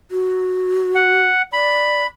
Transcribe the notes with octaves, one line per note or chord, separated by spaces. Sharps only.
F#4
F#5
D5 B5